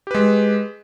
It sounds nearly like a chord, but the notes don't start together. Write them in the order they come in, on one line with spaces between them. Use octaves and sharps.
G4 B4 G#3